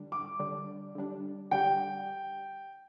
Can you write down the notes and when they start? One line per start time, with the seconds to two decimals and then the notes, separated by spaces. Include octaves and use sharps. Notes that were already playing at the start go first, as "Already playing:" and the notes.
Already playing: D3 G3 D4
0.12 D6
0.40 D3 G3 D4
0.95 D3 G3 D4
1.51 D3 G3 D4 G4 G5